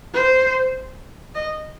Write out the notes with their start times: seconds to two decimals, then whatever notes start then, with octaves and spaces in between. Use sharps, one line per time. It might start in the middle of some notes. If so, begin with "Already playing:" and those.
0.14 C5
1.35 D#5